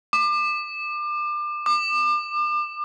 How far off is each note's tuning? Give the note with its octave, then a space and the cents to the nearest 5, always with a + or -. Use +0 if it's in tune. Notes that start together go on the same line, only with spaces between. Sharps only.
D6 +30
D6 +40